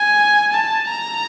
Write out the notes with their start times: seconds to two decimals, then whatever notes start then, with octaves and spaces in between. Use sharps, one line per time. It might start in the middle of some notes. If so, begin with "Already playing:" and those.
Already playing: G#5
0.52 A5
0.88 A#5